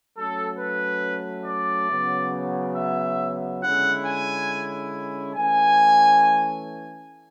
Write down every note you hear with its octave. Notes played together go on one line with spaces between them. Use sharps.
F#3 A3 C#4 A4
B4
D5
C#3 F#3 B3
E5
D3 G#3 C#4 E4 F#5
G#5
E3 A3 C#4 G#5